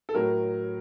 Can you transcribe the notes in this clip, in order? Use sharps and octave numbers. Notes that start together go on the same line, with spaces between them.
A4
A2 F#3 A#4